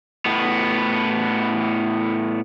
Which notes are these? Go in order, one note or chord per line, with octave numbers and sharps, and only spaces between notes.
A2 B3